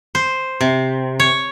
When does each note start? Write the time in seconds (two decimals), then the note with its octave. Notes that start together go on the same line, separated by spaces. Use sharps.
0.15 C5
0.61 C3
1.20 C#5